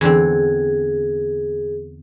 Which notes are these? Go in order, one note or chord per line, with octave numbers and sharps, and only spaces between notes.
E2 D3 C4 G#4